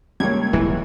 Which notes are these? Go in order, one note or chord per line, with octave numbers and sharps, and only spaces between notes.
C#2 G3 A#3 C#5 G#6
D1 B1 C3 E3